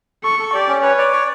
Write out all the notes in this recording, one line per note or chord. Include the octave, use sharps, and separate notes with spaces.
A4 C#6
A4
G4 D5
C#4
B4 C#5
D5
C#5